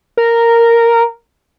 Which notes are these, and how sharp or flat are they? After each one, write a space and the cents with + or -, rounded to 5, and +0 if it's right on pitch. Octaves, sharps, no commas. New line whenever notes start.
A#4 -5